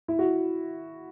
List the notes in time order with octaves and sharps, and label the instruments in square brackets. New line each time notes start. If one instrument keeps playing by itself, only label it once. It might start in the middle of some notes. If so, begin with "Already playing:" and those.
[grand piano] E4
F#4